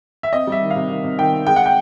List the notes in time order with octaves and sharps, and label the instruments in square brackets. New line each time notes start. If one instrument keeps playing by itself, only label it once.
[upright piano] E5
C4 D#5
G3 E5
D#3
F5
C3
D#3
C3
D#3 G5
C4
G#3 G5
F#5
G5